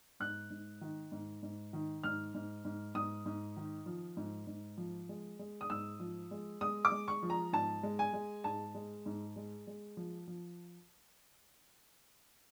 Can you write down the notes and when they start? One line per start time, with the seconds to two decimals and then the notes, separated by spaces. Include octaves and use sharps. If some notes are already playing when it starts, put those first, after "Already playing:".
0.20 G#2 F#6
0.50 G#2
0.81 D#3
1.12 G#2
1.43 G#2
1.73 D#3
2.03 G#2 F6
2.35 G#2
2.65 G#2
2.95 G#2 D#6
3.26 G#2
3.56 D#3
3.86 F3
4.17 G#2
4.47 G#2
4.78 F3
5.09 G#3
5.39 G#3
5.61 D#6
5.70 G#2 E6
6.00 F3
6.31 G#3
6.61 G#3 D#6
6.85 D6
6.92 G#3
7.08 C#6
7.23 F3
7.30 A#5
7.53 G#2 A5
7.83 G#3
7.99 G#5
8.13 G#3
8.44 G#2 A5
8.75 G#3
9.06 G#2
9.36 G#3
9.67 G#3
9.97 F3
10.27 F3